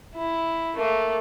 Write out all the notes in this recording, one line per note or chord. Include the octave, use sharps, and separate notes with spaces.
E4
A3 A#3